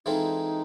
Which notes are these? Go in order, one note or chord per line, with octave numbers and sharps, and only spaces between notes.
E3 G#3 C4 D#4 F4 A4